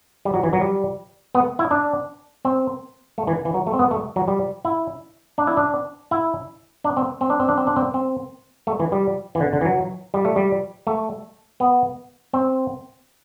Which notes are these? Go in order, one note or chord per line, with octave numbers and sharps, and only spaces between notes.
G3
F#3
E3
F#3
G3
B3
E4
D4
C4
A3
E3
E3
F#3
A3
C4
B3
A3
F#3
G3
E4
D4
E4
D4
E4
D4
C4
C4
D4
C4
D4
C4
D4
C4
C4
A3
E3
G3
E3
D3
D3
E3
F#3
G3
A3
G3
A3
B3
C4